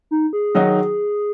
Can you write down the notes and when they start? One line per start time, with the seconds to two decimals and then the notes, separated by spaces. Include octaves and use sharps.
0.11 D#4
0.33 G#4
0.55 D#3 F#3 D#4 F#4